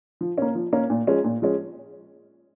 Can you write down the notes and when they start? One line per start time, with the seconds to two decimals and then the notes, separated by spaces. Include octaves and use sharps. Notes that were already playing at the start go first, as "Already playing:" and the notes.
0.21 F3
0.38 A#3 C#4
0.55 F3
0.73 A#3 C#4
0.90 A#2
1.07 F3 G#3 C#4
1.24 A#2
1.42 F3 G#3 C#4